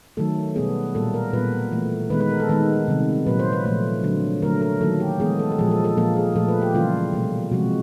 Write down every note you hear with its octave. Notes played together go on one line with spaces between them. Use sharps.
D#3 F#3 A3 A4
B2 G3 B3 G#4
A#2 G3 A#3 A4
A#4
A#2 G3 B3 B4
E3 A3
D#3 G#3 B3 B4
B4
A#4
A4
D#3 G#3 B3 B4
C3 D#3 G3
A#2 F#3 A#3 B4
C5
B4
A#2 F3 A3 B4
D3 F#3 A#3
D3 F#3 A3 A#4
A#4
D#3 F#3 A#3 A4
G4
E3 G#3 B3 G#4
A4
A4
A#2 F3 G#3 G#4
A4
A4
A#2 F3 A#3 A4
G#4
A#2 F3 A3 A4
B4
G4
C#3 E3 G3 A#3 F4
B2 G3 A#3
C3 F3 G#3 F#4